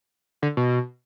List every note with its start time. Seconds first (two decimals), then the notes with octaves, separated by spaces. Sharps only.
0.42 D3
0.57 B2